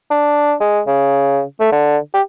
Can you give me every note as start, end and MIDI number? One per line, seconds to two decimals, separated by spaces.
0.11 0.54 62
0.60 0.81 56
0.87 1.42 49
1.60 1.71 57
1.72 1.98 50
2.14 2.22 67